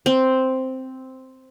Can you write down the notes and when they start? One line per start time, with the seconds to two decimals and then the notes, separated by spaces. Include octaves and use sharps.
0.06 C4